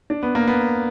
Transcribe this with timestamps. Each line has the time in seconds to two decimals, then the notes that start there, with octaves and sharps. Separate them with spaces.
0.10 D4
0.23 B3
0.35 A#3
0.48 B3